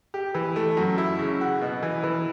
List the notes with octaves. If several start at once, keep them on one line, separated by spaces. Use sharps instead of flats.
G4
E3
A3
F#2
E4
C#3
F#4
B2
E3
E3